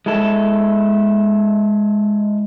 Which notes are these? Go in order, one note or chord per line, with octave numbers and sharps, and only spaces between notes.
G#3 E4 A4